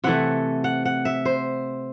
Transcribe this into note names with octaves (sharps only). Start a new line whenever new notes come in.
C3 E3 A3 F#5
F#5
F#5
E5
C5